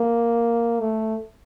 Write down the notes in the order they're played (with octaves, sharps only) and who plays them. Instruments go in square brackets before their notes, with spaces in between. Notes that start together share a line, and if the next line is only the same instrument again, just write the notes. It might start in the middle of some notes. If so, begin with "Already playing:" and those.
Already playing: [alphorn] A#3
A3